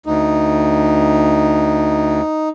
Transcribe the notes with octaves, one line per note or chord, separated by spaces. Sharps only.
D2 D#4